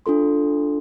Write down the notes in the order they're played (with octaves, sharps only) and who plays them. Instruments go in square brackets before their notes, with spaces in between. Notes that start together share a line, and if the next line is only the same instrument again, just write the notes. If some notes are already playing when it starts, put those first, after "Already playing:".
[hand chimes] D4 F4 A4 C6